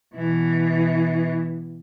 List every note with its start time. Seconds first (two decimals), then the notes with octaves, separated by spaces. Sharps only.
0.15 B2 E3